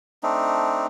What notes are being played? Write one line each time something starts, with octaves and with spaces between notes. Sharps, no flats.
A3 C4 D4 D#4